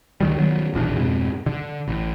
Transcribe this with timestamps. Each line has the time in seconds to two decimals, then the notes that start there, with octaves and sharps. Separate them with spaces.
0.21 C#2 D#3 G3
0.37 D#3 F#3 B3
0.74 D#1 B1 E2 D4
0.98 F2 G#2 B2
1.46 D3
1.88 A1